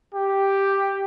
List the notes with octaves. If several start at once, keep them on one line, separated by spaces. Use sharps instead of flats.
G4